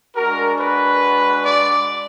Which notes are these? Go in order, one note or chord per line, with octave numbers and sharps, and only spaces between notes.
G#3 D4 F#4 A#4
B4
D5